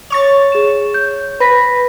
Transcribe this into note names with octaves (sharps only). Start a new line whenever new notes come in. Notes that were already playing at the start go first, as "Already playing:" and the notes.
C#5 C#6 A6
G#4 E7
G6
B4 B5 A#6 B6